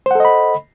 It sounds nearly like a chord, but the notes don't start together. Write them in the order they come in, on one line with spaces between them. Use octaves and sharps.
C5 F#5 A4 D#5 B5